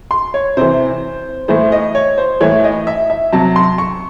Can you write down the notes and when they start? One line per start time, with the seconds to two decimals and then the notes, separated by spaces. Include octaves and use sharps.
0.11 C6
0.34 C#5
0.57 C3 E3 C5
1.48 A2 E3 C5
1.72 D#5
1.95 C#5
2.18 C5
2.40 A2 E3 C#5
2.64 D#5
2.87 E5
3.10 E5
3.32 C3 F#3 A5
3.56 C6
3.78 C#6